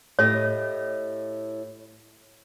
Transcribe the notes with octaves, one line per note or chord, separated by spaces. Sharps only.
A2 G4 C#5 D#5